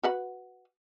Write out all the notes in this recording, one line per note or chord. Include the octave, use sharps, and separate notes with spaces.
F#4 B4 F#5